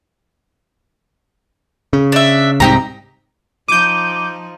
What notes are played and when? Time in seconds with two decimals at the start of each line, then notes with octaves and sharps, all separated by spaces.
1.93 C#3
2.12 D4 E5
2.60 C2 G#2 C3 D#4 G4 A#5
3.68 F3 D#4 D6 G6 D#7